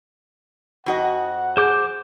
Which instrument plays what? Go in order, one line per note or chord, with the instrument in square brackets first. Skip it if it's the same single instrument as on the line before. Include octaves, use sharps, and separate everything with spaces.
[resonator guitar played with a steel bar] F2 F#4 D#5 [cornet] F#5
[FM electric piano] G#4 [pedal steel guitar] C5 D6 G6